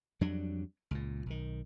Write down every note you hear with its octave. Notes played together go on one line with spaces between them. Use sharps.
F2 F#3 G3 D4
C#2 A#2
B1 D#3